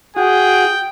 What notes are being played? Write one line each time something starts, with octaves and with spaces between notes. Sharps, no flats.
F#4 G#4 G5